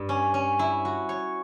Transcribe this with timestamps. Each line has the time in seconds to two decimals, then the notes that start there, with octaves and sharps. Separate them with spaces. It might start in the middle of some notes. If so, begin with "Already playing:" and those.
Already playing: G2
0.09 C#4
0.34 C#4
0.59 E4
0.85 F#4
1.09 C#5